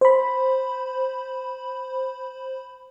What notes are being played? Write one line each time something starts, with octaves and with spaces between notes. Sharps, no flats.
C5 B5